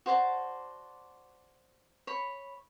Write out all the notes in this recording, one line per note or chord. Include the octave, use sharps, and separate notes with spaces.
F#4 C5 D5 A5
C#5 B5